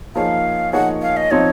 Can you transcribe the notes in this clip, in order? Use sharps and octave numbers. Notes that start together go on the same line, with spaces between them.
F3 A#3 D#4 G#4 C#5 F5
F3 A#3 D#4 G#4 C#5 F#5
F5
D#5
F3 C4 D#4 C#5